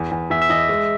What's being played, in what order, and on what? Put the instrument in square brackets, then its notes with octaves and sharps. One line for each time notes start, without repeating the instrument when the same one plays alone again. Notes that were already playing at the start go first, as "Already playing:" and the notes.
Already playing: [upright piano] E2
E2
[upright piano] E2 [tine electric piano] E5
[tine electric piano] E5
[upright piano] E2 [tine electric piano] D#5
[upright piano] G#3